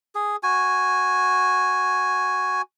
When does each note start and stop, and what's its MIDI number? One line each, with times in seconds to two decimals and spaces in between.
0.15 0.36 68
0.43 2.62 66
0.43 2.62 80